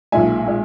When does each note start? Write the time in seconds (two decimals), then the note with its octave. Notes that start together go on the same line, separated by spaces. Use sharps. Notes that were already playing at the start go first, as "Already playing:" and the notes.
0.12 B1 A#2 G#3 E5 G#5
0.46 A#2 G#3